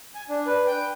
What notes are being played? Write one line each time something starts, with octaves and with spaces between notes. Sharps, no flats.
G#5
D4
B4
G5